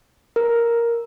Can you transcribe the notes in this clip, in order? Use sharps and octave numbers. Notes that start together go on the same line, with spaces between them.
A#4